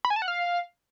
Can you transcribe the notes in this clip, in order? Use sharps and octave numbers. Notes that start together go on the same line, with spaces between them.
B5
G#5
A5
F#5
F5